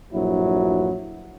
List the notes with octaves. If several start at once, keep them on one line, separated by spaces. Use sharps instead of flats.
A#1 G2 F#3 E4